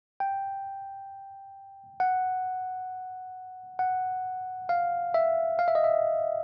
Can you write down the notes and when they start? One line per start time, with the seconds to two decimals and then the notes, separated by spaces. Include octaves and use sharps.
0.20 G5
2.00 F#5
3.79 F#5
4.69 F5
5.14 E5
5.59 F5
5.68 E5
5.75 D#5
5.84 E5